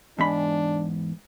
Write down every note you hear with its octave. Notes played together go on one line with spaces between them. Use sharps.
E2 G#2 D4 B5